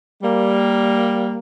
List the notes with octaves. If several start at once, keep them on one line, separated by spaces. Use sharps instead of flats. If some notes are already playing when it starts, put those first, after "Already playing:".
G3 A#3